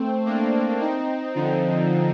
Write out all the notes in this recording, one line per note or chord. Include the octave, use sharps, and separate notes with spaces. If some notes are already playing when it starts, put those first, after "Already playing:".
Already playing: A3 C4
A#3 D4
C4 D#4
D3 F3